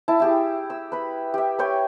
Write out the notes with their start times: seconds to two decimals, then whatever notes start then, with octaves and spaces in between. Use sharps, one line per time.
0.08 E4 A5
0.20 E4 G4 G#4
0.70 E6
0.92 B4 B5
1.34 G4 E5
1.59 B4 C#5 G5 G#5